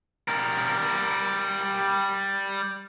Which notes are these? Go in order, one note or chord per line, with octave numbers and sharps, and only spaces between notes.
G3 A#4